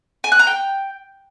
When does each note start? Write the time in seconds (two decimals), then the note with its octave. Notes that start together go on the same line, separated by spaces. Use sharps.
0.24 G#5
0.32 F#6
0.39 A#5
0.47 G5